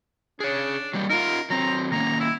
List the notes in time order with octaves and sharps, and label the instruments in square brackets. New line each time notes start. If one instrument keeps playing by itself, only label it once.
[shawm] D4 [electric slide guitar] G#4 C#5
[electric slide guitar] F#3 G3 A#3
[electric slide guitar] D#4 F4 [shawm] A#4
[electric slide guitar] F#3 C4 [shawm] A#5
[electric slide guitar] D#3 A#3 C#4 [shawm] A#5
[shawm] E4